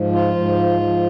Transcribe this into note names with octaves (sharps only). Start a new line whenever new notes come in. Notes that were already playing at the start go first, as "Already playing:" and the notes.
Already playing: G#2 F3
F4
G#2
F3